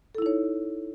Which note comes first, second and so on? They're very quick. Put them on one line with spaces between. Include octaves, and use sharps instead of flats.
A4 E4 D#4 C#5